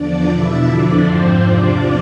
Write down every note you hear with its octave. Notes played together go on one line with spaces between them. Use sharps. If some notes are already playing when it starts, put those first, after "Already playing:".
Already playing: E2 D3 F3 D4 D5
E2 B2 E4 E5
F2 D3 F3 D4 D5
G#2 F3 C4 C5
E2 C3 F3 D4 D5